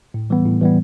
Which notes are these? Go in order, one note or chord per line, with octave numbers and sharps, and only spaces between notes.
A2
E3 G3 B3
A2
E3 G3 B3